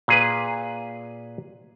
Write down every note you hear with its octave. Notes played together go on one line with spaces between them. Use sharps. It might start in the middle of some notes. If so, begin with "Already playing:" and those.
A#2 G#4 B4